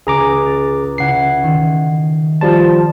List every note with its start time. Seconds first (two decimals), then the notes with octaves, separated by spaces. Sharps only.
0.07 C#2 G#4 A#5 D6
0.46 A6
0.98 C#3 E4 F#5 C7
1.43 D#3
2.41 F3 G3 C5 A5